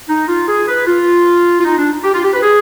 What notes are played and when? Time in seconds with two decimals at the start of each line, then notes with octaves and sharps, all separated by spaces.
0.09 D#4
0.28 F4
0.48 G#4
0.68 B4
0.87 F4
1.60 F4
1.65 D#4
1.78 D4
2.04 G4
2.14 F4
2.23 G4
2.34 B4
2.43 G#4